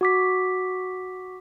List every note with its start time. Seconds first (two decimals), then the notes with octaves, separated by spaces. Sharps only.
0.01 F#4 D6 B6